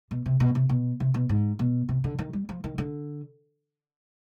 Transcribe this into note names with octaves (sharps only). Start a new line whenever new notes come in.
B2
C3
B2
C3
B2
C3
B2
G#2
B2
C3
D3
D#3
G3
F3
D#3
D3